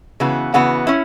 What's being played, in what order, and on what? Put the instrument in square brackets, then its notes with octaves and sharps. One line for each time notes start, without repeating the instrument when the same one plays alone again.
[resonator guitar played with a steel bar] C#3 E3 B3 F#4
[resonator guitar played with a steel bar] C#3 E3 B3 F#4 [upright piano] F#5
[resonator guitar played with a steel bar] C#4 E4